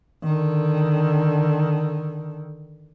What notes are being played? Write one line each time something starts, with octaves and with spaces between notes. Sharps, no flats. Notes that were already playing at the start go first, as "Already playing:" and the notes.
D3 D#3